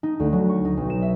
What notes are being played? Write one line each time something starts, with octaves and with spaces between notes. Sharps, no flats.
D#4
D2
F#3
C#6
D#4
B1
E7
E5